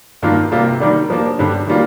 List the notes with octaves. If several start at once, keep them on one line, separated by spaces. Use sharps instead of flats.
G2 D#3 A#3 F4
C3 G3 A#3 F4
D#3 G3 A#3 D4
F3 A#3 D4
G2 D3 G3
D#3 G3 A#3 F4